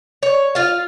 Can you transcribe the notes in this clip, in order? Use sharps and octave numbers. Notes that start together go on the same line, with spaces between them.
C#5
F4 F5